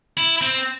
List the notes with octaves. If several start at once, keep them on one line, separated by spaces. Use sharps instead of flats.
E4
C4